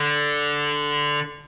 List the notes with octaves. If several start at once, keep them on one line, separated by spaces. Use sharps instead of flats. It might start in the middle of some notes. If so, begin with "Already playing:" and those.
Already playing: D3